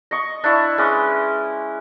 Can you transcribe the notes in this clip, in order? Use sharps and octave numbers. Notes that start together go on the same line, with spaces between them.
D#5 C#6
D4 E4 C#6
G#3 C#4 B4 D6